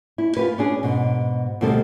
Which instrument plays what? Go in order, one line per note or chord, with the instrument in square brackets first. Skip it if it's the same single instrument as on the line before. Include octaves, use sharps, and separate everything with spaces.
[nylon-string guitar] E4
F4 G4 B4
C#4 D4 G#4
G#2 B2
D2 B2 G3 C4 A4